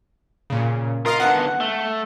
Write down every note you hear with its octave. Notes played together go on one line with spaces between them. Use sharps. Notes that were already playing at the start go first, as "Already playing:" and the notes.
A#2 C#3
F4 A#4 D#5 F5
D3 B3 F#5
A3